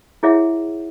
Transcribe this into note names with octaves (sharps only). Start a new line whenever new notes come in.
E4 G#4 C#5 E5 F#5